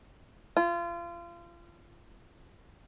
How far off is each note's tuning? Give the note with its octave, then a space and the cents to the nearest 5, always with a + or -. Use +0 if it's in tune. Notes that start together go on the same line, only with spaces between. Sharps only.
F4 -30